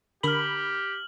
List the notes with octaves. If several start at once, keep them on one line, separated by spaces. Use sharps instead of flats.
D3 G4 A#4 B5 F6 F#7